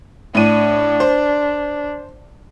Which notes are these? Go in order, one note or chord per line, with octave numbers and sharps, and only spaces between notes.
A2 D4 D#7
C5